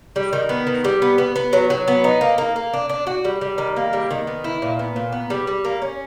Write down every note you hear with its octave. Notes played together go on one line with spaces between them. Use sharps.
G3
D#3
B3
D#3
G3
B3
B3
B3
F#3
F#3
B3
D#4
A#3
A#3
A#3
D4
D4
F#4
G3
G3
D#3
A#3
G3
D#3
B3
E4
A#2
B3
A#2
B3
G3
G3
A#3
C#4